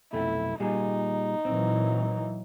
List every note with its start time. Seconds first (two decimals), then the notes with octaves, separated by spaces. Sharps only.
0.13 B1 F2 A3 E4
0.60 A#2 G3 D#4 G#4
1.45 A#2 E3 F#3 C4